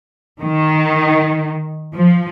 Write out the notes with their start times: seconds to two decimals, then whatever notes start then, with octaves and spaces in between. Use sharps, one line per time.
0.41 D#3
1.95 F3